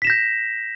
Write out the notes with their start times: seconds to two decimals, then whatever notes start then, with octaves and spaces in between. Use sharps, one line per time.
0.02 B6
0.04 E7
0.07 A#6
0.10 G6